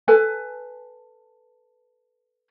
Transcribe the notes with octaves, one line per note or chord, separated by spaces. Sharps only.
A4 B4 G#5